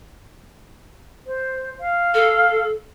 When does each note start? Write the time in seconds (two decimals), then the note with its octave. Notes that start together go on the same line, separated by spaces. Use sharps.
1.27 C5
1.80 F5
2.14 A4